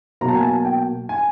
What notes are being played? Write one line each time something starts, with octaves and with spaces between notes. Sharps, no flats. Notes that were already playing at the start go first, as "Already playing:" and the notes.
B2 F#3 A#3 A#5
A5
G#5
A5
G5
G#5